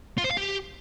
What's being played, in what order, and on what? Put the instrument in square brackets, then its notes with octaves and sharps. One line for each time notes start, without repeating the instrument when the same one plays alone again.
[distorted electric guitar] F4
C5
F5
G4